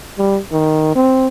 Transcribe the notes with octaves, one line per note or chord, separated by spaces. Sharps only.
G3
D#3
C4